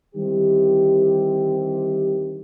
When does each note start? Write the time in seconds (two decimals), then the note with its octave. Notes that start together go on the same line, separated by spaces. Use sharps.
0.15 D3 D#3 G3 C4 E4 G4